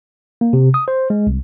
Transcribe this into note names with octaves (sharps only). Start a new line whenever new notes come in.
A#3
C3
D#6
C5
G#3
C2